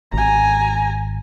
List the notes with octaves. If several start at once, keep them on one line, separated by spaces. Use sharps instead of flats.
G#1 G#5 A#5